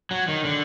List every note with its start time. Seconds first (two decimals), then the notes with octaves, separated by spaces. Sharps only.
0.11 F#3
0.28 D#3
0.45 D3